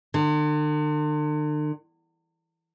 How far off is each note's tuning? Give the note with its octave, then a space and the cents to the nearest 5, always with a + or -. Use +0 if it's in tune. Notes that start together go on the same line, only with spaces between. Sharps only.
D3 +45